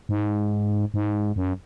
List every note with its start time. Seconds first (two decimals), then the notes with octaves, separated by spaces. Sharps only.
0.09 G#2
0.94 G#2
1.36 F#2